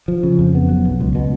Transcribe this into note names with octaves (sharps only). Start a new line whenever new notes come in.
F3
C#3
F2
B3
F#3
B1
C#2
B2